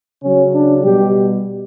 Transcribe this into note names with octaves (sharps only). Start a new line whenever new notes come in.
C#3 F#3 C#4
D4
B2 G3 G4